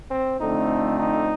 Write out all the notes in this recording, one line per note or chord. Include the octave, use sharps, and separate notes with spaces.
C4
F2 D3 A3 C4 D#4
D#4